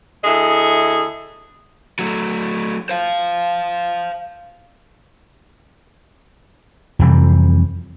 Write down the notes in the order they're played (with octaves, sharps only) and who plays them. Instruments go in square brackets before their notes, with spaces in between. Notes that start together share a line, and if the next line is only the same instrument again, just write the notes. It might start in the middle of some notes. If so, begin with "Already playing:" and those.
[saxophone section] D2 E4 G#4 A4 D#5
[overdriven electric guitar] F#3 A3
C5 F5
[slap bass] F2 C3 E3 G3